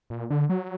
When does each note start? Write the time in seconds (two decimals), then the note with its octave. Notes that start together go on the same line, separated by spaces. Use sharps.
0.10 A#2
0.30 D3
0.50 F#3